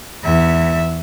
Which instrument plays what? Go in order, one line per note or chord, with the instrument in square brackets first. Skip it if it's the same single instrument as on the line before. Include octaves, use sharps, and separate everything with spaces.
[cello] E2 E5